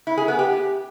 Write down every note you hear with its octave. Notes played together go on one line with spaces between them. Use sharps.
E4
G#4
B3
G4